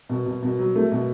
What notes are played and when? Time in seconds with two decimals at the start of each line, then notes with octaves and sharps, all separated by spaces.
0.09 B2
0.26 B2
0.43 B2
0.59 F#3
0.75 A3
0.92 B2